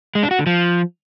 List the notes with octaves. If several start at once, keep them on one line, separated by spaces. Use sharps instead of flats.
G#3
D4
F#4
D3
F3